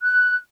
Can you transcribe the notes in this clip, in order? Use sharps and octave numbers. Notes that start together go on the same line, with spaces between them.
F#6